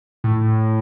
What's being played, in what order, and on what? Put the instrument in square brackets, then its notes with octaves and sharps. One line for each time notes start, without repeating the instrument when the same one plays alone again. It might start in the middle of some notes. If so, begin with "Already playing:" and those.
[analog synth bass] A2